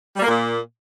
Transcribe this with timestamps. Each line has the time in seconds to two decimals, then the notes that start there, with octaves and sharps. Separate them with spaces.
0.16 G3
0.22 A#3
0.28 A#2